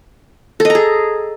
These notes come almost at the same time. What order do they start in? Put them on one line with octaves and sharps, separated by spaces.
A4 D#5 A#5 G#4